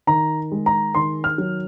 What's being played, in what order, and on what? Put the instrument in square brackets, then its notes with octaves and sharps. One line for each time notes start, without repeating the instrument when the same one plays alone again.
[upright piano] D#3 A#5
G#3
A#5
D#3 C6
F6
F#3